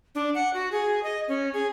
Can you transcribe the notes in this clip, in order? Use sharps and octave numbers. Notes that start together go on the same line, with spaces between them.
D4
F#5
F#4
G#4
D#5
C#4
G#4